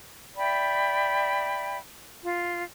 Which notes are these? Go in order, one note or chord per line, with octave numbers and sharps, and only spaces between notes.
D5 E5 G5 B5
F4